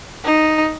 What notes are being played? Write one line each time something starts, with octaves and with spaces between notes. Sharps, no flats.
D#4